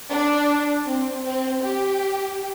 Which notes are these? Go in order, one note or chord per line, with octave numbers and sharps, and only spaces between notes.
D4
C4
C4
G4